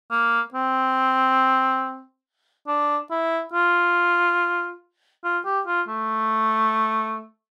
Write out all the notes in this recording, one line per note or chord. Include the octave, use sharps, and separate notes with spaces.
A#3
C4
D4
E4
F4
F4
G4
F4
A3